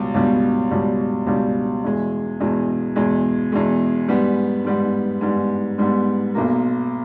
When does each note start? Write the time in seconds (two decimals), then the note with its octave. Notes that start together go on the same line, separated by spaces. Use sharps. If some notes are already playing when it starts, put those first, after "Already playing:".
Already playing: C#2 B2 G3
0.14 C#2 B2 G3
0.71 C#2 B2 G3
1.27 C#2 B2 G3
1.84 E2 B2 G#3
2.40 E2 B2 G#3
2.96 E2 B2 G#3
3.52 E2 B2 G#3
4.08 G#2 G3 B3
4.65 G#2 G3 B3
5.21 G#2 G3 B3
5.78 G#2 G3 B3
6.35 B1 B2 A#3